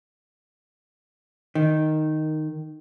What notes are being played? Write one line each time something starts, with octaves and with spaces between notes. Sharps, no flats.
D#3